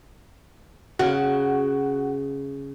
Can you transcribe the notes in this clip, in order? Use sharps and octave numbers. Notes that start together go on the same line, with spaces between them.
C#3 F#4